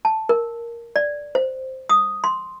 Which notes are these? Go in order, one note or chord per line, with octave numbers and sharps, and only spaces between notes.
A5
A#4
D5
C5
D#6
C6